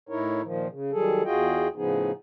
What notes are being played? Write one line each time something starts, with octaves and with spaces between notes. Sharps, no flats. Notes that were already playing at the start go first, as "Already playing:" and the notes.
A2 D#4 E4 A#4 C#5
A#2 D#3 F3
C#3
D#3 F#3 G3 G#4 A4
E2 F4 F#4 G#4 D#5 G5
A2 C#3 F3 B3 D#4 G#4